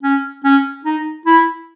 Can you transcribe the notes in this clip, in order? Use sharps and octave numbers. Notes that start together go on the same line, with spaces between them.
C#4
C#4
D#4
E4